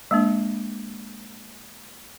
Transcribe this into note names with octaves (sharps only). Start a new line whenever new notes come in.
G#3 A#3 D4